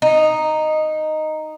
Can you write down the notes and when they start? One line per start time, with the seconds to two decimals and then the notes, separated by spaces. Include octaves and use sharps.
0.02 D#4